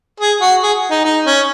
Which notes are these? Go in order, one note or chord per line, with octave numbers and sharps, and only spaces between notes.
G#4
F#4
G#4
D#4
D#4
C#4